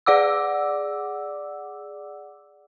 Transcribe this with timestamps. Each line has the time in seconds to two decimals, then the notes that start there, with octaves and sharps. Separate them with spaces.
0.06 G#4 D5 F#5 D6 E6